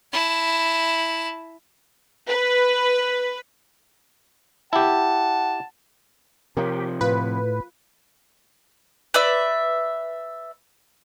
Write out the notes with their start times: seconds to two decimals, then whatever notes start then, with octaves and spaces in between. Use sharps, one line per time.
0.12 E4 A5
2.29 B4
4.73 E4 G4 F#5 A5
6.57 C3 F3 G4 A#4 C#5 F5
7.01 A2 F4 B4
9.14 B4 D5 E5 E6